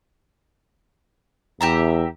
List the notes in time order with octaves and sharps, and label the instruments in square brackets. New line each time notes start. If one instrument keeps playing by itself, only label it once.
[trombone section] E2 [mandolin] G4 E5 A#5